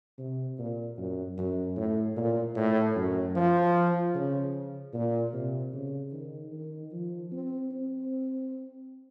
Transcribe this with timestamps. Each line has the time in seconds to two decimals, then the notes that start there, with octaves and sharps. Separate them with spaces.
0.18 C3
0.59 A#2
0.98 F#2
1.38 F#2
1.77 A2
2.17 A#2
2.56 A2
2.96 F#2
3.36 F3
4.15 C#3
4.94 A#2
5.34 C3
5.74 C#3
6.13 D#3
6.52 D#3
6.92 F3
7.32 C4
7.71 C4